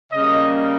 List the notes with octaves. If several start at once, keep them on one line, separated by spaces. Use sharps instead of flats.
C#3 G3 A#3 D#5